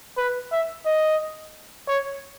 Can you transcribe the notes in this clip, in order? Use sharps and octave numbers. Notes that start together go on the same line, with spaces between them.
B4
E5
D#5
C#5